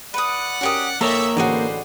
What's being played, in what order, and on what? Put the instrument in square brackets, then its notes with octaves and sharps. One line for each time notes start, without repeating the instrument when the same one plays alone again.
[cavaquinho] B4 D#6 [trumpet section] D5 F#5
[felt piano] C#4 A#4 [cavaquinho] F#4 G4 D#6
[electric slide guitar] A#3 A#4 C#5 [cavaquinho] A4 D5 [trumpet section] E5 [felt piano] A#5
[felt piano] A1 A2 D3 [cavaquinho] F#4 G#4 D5 [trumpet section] B4 C5